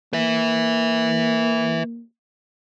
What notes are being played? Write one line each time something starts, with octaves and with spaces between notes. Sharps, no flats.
A#3 B4 E5